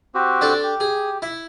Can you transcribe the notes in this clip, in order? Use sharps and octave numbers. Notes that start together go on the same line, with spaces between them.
C4 F#4 G4
D4 A4
G4
G#4
E4